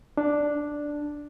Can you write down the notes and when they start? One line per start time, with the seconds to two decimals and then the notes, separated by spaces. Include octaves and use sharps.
0.17 D4